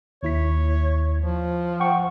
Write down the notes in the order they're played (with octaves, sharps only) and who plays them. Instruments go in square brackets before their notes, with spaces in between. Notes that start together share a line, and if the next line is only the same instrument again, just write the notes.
[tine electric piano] D#2 E4 B6 [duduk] C#5
[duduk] F3
[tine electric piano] F#5 G5 C#6